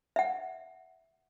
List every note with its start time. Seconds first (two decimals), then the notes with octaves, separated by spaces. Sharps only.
0.16 E5 F#5